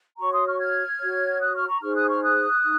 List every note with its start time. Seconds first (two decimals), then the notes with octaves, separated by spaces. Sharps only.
0.19 F#4 C#5 A#5 C#6
0.31 C6 D#6
0.46 C#6 F6
0.59 F6 G#6
1.00 F#4 C#5
1.41 D#6 F#6
1.54 C#6 F6
1.67 A#5 C#6
1.81 D#4 G#4 C5 C#6 F6
1.95 D#6 F#6
2.08 C#6 F6
2.22 D#6 F#6
2.63 D#4